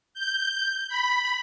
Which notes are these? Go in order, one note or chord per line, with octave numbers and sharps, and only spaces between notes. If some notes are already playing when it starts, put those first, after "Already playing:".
G6
B5